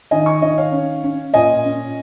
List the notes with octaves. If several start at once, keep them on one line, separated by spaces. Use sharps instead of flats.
D#3 D#5 G#5
G#5 C#6
D#3 D#5
C#5 F5
C#4
C#4
A#2 D#5 G#5
C#4